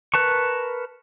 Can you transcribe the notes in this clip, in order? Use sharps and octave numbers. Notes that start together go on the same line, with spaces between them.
A#4 B4 A5 C#6